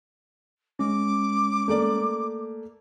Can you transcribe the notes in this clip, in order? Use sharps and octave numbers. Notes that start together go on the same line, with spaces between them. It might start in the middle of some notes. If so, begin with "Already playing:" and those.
G#3 C#4 D6
A3 A#3 D5